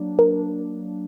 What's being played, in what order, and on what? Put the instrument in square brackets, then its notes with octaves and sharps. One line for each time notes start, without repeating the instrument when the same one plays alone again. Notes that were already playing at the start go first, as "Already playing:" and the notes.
Already playing: [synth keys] F#3 A#3 D4
[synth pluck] A#4